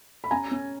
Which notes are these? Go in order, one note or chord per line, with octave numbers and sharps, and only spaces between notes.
B5
C#4 G#5 A#5
C#4